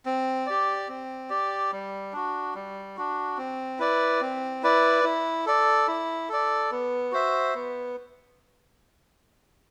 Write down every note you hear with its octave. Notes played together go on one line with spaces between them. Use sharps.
C4
G4 D5
C4
G4 D5
G3
D4 F#4
G3
D4 F#4
C4
E4 B4 D5
C4
E4 B4 D5
E4
A4 D5
E4
A4 D5
B3
F#4 C5 E5
B3